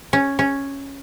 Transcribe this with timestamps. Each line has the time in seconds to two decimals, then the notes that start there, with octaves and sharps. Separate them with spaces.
0.13 C#4
0.39 C#4